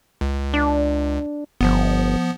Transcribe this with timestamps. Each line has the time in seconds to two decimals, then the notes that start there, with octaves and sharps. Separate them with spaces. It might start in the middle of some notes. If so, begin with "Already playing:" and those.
0.21 C#2
0.54 D4
1.61 G1 F3 B3